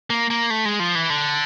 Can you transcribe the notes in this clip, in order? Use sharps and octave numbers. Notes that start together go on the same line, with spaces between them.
A#3
A#3
A3
G#3
F3
E3
D3